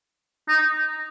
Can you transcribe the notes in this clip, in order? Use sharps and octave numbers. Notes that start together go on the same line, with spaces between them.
D#4